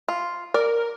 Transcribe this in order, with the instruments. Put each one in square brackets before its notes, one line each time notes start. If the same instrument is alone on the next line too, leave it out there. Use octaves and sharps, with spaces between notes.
[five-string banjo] F4
[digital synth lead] A#4 [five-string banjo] D5